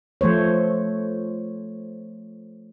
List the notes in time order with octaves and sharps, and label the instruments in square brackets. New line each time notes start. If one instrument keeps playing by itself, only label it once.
[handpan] F3 A3 C5 C#5